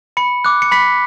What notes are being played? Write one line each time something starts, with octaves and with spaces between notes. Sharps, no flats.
B5 C#7
D6 F#6
C#7
B5 B6